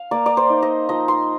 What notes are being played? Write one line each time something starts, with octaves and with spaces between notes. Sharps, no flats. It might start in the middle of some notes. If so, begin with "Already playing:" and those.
Already playing: F5
A#3 D5
D5
C5
D#4
D#5
F3 D#5
C6